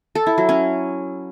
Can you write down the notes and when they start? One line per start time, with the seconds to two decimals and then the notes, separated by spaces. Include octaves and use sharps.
0.15 A4
0.27 E4
0.38 F#3
0.49 C#4